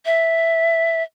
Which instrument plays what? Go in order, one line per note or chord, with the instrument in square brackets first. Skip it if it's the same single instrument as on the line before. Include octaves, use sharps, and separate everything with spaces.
[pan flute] E5